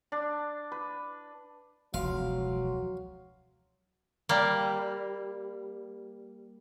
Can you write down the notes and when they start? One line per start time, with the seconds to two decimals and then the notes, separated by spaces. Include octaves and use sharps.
0.12 D4
0.72 B4
1.94 E1 C#2 F3 F#3 F5 C6
4.29 G3 A#3